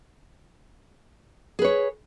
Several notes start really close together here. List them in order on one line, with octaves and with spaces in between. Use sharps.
G#4 B4 C#5